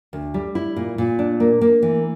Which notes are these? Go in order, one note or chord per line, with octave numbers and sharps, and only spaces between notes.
D2
G3
E4
A#2
A#2
D4
A#3
A#3
E3